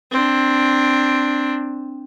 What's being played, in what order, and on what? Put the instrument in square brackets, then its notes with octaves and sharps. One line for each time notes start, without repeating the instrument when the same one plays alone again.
[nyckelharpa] C4 D4